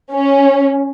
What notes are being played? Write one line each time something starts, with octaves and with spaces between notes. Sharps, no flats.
C#4